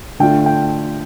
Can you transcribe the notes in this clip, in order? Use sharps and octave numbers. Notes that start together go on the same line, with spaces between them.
D3 A3 D4 F4 G5
G5